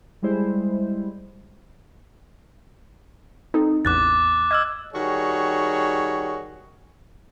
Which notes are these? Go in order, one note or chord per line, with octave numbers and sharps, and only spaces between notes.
G3 G#3 E4 C5
C4 D#4 A4
A1 E2 D6 F#6 A6
D#5 E6 F6 G#6
D#3 G3 F#4 G#4 C#5